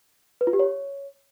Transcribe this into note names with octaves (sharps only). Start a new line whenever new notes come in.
B4
F4
G4
C#5